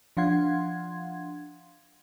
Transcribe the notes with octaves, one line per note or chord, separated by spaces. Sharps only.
F3 D4 F5 F#5 C6 G#6